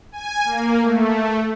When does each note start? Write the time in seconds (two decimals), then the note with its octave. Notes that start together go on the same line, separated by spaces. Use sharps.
0.12 G#5
0.44 A#3
0.83 A3